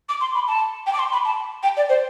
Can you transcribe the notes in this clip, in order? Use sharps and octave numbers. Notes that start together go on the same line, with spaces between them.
D6
C6
B5
A5
G5
D6
C6
B5
A5
G5
D5
C5